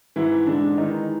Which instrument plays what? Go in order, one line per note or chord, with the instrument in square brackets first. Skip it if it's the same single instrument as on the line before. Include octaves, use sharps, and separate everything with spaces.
[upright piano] G#2 E3 E4
D3 G#3 D4
D#3 E3 D#4